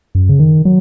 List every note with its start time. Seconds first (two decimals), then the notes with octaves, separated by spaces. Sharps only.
0.15 F#2
0.29 C#3
0.39 D#3
0.65 F#3